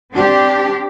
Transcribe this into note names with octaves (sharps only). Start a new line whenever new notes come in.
C4 D4 G4